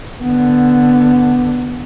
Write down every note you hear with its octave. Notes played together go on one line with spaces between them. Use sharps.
D3 B3